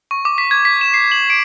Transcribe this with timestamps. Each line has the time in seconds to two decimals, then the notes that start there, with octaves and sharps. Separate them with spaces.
0.11 C#6
0.25 D6
0.38 B6
0.51 G#6
0.65 B6
0.81 E7
0.94 C7
1.12 F#7
1.30 D7